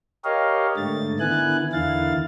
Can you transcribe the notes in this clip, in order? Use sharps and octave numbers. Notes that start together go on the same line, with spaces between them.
G4 A#4 C#5 D#5 F5
G#2 D3 A3 A6
D3 D#3 B3 E4 G#5 F#6
E2 D3 D#3 E4 F5 A6